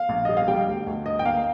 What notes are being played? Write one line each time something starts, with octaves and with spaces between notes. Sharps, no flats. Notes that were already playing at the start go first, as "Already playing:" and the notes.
Already playing: F5
A#1
G3 D#5
F5
G3 G5
D2
D2
D2 D#5
G5
A#3 F5